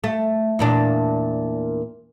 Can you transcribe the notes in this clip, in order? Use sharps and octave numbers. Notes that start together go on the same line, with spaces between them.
A3
E2 A#2 D4